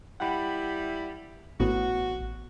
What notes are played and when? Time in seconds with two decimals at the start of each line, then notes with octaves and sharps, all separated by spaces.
0.20 G3 E4 F#5 G5 B5
1.60 A1 A2 B3 F#4